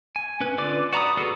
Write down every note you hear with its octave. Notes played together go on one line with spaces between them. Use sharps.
G#5
C#4 B4
D3 F4 B4 D5 D6
F#4 D5 A#5 B5 D#6
B3 F#4 G#4 A4 B4